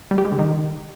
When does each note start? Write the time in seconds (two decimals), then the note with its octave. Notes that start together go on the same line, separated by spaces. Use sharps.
0.11 G3
0.18 G4
0.25 G#3
0.32 D3
0.39 D#3